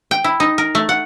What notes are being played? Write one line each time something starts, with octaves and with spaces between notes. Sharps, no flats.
G5
E4
D#4
A#4
A3
F#5